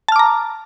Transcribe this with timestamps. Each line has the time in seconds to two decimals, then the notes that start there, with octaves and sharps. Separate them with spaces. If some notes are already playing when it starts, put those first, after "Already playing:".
0.08 A5
0.12 F6
0.16 D6
0.19 A#5